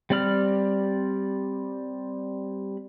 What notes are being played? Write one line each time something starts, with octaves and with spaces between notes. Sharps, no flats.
G3 C4 D5 B5 F6